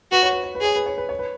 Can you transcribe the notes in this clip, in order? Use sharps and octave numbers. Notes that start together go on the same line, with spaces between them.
F#4 B4
C#5
B4
C#5
B4
G#4 C#5
B4
C#5
B4
C#5
B4